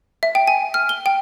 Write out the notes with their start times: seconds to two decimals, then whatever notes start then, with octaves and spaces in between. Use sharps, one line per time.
0.23 E5
0.35 G5
0.47 G#5
0.74 F6
0.89 G7
1.06 G5